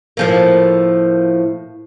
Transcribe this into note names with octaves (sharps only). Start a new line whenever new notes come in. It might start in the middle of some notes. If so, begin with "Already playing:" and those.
A2 F3 A#3